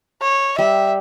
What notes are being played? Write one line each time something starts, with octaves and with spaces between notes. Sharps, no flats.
C#5
G3 E5